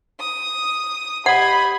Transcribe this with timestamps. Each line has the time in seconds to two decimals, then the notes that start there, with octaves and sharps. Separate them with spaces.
0.20 D#6
1.26 G4 D#5 F#5 B5 G#6